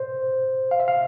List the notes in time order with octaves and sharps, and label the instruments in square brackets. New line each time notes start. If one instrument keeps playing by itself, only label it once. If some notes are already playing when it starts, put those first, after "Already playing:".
Already playing: [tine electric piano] C5
F5
E5
F5